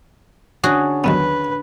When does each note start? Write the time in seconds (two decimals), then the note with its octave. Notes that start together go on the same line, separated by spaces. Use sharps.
0.64 D3 C#4 D4 F#4 G#4
1.04 D#2 F#3 B3 B4